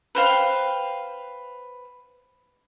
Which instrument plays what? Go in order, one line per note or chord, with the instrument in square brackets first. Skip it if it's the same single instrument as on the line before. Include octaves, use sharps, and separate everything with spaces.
[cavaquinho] B4 C5 F5 G5